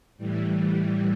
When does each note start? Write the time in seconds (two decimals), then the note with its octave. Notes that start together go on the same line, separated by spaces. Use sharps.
0.17 A2 E3 G3